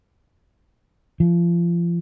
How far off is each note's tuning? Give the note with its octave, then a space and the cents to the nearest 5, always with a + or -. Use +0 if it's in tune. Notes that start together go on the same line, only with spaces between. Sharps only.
F3 -30